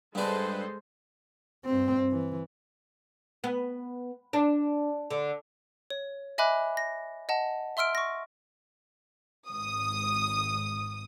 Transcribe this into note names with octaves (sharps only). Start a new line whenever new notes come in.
G2 G#3 D4 A4 B4 C5
G2 C4
E3
B3
D4
D3
C#5
D#5 E5 G#5 B5 D6 F#6
A#6
D#5 F#5 A5
E5 C6 E6 F6 D7
C#6 A#6
G#1 D#6